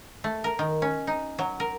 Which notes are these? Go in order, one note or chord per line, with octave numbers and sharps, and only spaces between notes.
A3
A#4
D#3
C#4
D#4
F#3
A#4